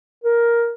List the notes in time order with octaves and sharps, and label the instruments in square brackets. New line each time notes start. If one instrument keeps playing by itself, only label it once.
[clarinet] A#4